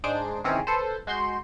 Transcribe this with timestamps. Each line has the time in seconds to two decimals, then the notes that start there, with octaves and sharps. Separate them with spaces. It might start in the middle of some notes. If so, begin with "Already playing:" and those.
0.04 G#2 D4 D#4 G#4 C5 D7
0.44 C3 D#3 E3 C4 C#4 G#4
0.67 A4 B4 C5
1.07 G#3 F#4 C6 G6